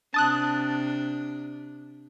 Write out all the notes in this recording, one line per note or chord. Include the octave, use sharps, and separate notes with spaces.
C3 D4 A5 D#6 F#6